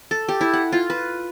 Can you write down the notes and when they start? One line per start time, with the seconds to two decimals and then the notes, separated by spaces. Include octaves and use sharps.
0.11 A4
0.29 G4
0.41 E4
0.54 F#5
0.73 F4
0.90 B4